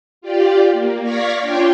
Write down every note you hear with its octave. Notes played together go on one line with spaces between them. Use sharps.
F4 G4 D5
A#3
D5 F5 C#6 G#6 A#6 B6
D4 F4 C#5 G5 C6 D6